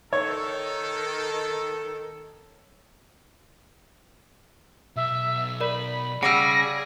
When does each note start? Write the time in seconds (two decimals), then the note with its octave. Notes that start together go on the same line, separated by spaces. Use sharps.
0.13 D#3 A4 C#5
4.96 B1 E5
5.60 A#4 D5 B5
6.23 C#3 G3 G#4 F#5 D6 E6 A#6